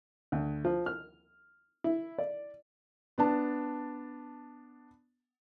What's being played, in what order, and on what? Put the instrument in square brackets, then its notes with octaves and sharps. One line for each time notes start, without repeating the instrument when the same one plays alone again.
[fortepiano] D2
F3
F6
E4
D5
[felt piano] B3 D4 A5